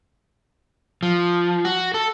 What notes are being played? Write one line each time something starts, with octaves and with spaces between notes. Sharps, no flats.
F3
F#4
A4